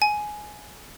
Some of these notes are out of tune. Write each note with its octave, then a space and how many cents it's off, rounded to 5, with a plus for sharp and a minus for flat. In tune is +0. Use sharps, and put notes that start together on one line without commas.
G#5 +10